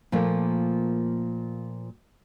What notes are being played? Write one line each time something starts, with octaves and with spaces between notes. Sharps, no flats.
A#2 F3 A3 A#3